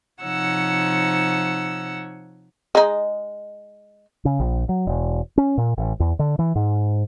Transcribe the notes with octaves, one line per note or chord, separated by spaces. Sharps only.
C3 F3 D#4 C#5 F#5 E6
G#3 D#4
C#3
A#1
F#3
E1
C#4
A#2
A1
E2
D3
E3
G#2